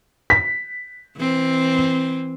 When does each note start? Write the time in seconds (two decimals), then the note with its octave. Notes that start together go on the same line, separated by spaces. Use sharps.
0.30 B6
1.17 E3 C4